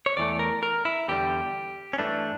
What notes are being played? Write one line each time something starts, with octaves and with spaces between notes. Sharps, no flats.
C#5
E2 E3 A3 D5
A#4
A#4
E4
E2 D3 G3 G4
C#4
G2 E3 A3 D4